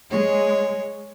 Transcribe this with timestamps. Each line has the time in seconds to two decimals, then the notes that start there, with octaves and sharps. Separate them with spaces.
0.11 G#3 C#5